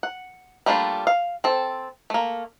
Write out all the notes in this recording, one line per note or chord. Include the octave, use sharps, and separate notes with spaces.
F#5
G3 A3 A#3 D4 F4
F5
C4 A4
A3 A#3